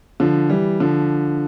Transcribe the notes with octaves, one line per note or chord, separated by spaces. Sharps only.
D3 F3
E3 G3
D3 F3